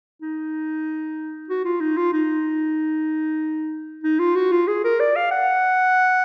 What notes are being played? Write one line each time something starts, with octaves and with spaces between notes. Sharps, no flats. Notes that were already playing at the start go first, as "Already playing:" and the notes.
D#4
F#4
F4
D#4
F4
D#4
D#4
F4
F#4
F4
G#4
A#4
D5
F5
F#5